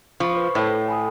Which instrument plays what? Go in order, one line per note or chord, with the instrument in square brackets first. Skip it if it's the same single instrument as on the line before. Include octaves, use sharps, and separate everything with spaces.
[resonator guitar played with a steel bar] F3 [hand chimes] B5 C#6
[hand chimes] B4 C5
[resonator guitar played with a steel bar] A2 [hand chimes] A4 C#5
[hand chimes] G#5 B5 D#6